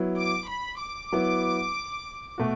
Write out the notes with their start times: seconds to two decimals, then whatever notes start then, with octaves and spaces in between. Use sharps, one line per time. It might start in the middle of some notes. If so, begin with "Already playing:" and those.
Already playing: F#3 B3 E4
0.18 D6
0.48 B5
0.81 D6
1.12 F#3 B3 E4
2.38 B2 A3 F#4